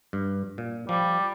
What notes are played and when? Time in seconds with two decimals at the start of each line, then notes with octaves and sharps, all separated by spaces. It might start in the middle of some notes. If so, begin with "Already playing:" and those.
0.13 G2
0.58 A#2
0.89 F3 G3